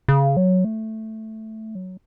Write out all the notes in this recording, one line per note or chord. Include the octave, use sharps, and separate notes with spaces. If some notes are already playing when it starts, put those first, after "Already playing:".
C#3
F#3
A3
F#3